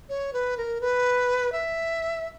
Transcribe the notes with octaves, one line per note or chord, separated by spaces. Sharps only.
C#5
B4
A#4
B4
E5